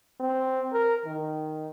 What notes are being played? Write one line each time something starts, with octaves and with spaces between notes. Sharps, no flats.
C4
A#4
D#3